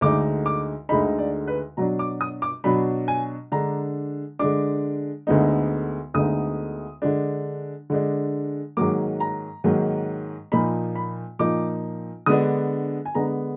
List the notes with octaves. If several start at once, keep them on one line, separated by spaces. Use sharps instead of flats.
D2 D3 G#3 D#4 D6
D6
D2 D3 G#3 D#4 B5
D5
B4
B2 F#3 D4 A#5
D6
D#6
D6
B2 F#3 D4 B5
G#5
D3 G#3 D4 A#5
D3 G#3 D4 D6
D2 D3 G#3 B3 D#4
D2 D3 G#3 B3 D#4 D#6
D3 G#3 D4
D3 G#3 D4
G#2 D#3 F#3 A#3 D6
A#5
G#2 D#3 F#3 A#3
A#2 F3 A#3 D#4 B5
B5
A#2 F3 A#3 D#4 D6
D3 G#3 B3 D4 D#6
G#5
D3 G#3 B3 D4 A#5